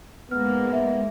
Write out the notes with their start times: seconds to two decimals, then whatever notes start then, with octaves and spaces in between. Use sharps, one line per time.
0.31 G#2 G#3 A#3 B3 F6
0.73 E5